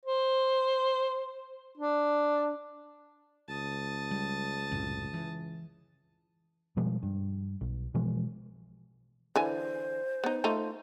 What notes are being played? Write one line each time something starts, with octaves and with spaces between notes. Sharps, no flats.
C5
D4
C#2 A5 D#6
G3
C2 F#2 A2
E3
B2 F3 G3 G#3
G2
B1
B2 E3 F3 G#3
D3 E3 C5 G#5
B3 D#4
A3 D#4 F4